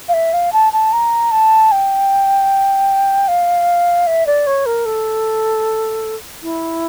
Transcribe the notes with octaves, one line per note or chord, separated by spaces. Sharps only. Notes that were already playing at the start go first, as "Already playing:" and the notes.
F5
E5
F5
A5
A5
A#5
A5
G5
F5
E5
D5
C#5
A#4
A4
E4